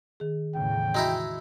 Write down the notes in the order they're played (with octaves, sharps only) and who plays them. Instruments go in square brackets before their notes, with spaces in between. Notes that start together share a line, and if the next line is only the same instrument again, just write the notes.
[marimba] D#3 G#4
[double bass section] E2 A2 C#3 [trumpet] G5
[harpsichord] G#3 D#4 E4 [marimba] F#4 A#5 E6